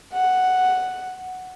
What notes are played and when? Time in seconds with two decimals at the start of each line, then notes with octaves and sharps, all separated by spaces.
0.13 F#5